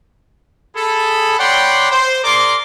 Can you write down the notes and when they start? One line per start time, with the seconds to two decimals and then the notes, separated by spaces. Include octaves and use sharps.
0.75 G#4 A4 B5
1.39 C#5 D5 F#5 G5 B5 C6
1.91 C5
2.24 G#4 A#4 D5 C6 D6